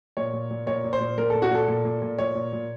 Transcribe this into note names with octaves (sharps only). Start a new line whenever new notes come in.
A#2 C#5
A#2
A#2
A#2 C#5
A#2
C5
A#2
A#2 A#4
A#2 A4
F#4
A#2 A4
A#2
A#2
A#2
A#2 C#5
A#2
A#2